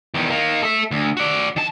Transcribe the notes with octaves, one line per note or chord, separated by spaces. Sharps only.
E2 D#3
D#3 A#3
A4 E5
D2
F#4 D5
D#3 A5